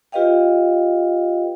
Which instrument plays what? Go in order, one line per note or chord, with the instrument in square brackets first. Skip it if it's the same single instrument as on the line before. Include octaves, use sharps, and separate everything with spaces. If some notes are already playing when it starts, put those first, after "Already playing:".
[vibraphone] F4 G4 B4 D#5 F5 G5